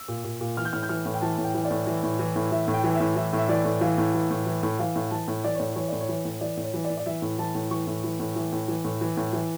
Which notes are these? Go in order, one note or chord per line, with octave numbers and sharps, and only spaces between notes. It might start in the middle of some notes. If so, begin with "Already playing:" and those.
Already playing: E6
A#2
A#2
A#2
E3 F6
G6
A2 F6
G6
E3 F6
A2
G5
E3 A5
A2
G5
E3
D5
A2
E3
A2
E3
A2
E3 E5
A2
G5
E3
E5
A2
E3 E5
A2 E5
E3 D5
A2
E3 F5
A2
E3
A2
E3
A2
E3 F5
A2
E3 A5
A2
E3 D5
C#5
A2 D5
E3 C#5
A2 D5
C#5
E3
A2
E3 D5
A2
C#5
E3
D5
A2
D5
E3 E5
A2
E3 A5
A2
E3 C#6
A2
E3
A2
E3
A2
E3
A2
E3
A2
E3